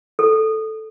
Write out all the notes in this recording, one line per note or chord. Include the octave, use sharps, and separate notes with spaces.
A4